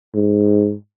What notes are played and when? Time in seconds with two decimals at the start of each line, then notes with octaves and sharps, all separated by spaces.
0.15 G#2